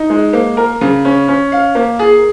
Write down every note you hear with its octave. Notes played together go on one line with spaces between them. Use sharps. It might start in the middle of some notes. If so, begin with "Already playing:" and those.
Already playing: D#4
G#3
A#3
A#4
C#3
C#4
C#4
F5
A#3
G#4